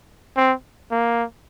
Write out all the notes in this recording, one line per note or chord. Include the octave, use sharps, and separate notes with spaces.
C4
A#3